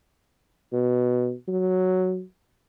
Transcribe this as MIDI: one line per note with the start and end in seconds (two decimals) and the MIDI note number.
0.72 1.33 47
1.48 2.22 54